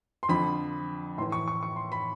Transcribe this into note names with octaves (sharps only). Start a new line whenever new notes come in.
C6
F2 D3 F3 B5
A2 E3 C6
C#6
C#6
C#6
C6
B5